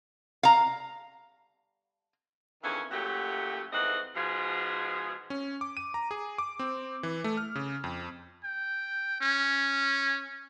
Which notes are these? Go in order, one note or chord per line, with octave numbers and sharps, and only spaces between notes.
F5 A#5
F2 D#3 E3 C#4 D4 G#4
A#2 F#3 A3 C#4 F#4 G4
F2 G#2 E3 C4 D#5 F#5
G#2 B2 F3 G#3 G#4
C#4
D6
D#7
A#5
G#4
D6
C4
E3
A3
F6
C#3
F2
G5
C#4